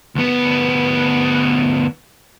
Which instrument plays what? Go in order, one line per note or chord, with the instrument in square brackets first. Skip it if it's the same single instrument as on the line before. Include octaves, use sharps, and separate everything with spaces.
[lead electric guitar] D2 B3